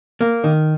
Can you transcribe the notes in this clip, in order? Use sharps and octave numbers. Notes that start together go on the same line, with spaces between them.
A#3
D#3